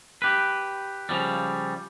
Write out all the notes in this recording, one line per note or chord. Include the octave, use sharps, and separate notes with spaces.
G4 B4
C#3 F3 G3